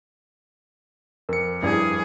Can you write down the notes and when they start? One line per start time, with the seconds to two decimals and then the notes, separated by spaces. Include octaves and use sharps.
1.29 F2 A#4 C#7
1.63 G2 E4 G#4 D5